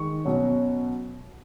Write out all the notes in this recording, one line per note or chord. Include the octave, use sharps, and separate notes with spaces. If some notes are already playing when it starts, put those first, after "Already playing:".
Already playing: D#3 G#3 C#6
B2 F#3 C#4